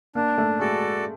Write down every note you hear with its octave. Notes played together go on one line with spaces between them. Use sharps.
A#3 D4
A3
G#3 F#4 A4 D5